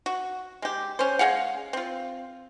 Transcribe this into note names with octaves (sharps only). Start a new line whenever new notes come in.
F#4
G#3 G4
C#4 C5
G#3 G#4 F5 F#5
C4 F4